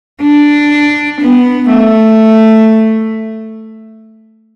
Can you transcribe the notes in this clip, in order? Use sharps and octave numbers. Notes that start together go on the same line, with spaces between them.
D4
B3
A3